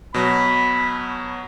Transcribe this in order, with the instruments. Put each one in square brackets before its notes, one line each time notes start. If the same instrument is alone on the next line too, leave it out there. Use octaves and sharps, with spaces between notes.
[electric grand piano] B2 F#3 [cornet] B5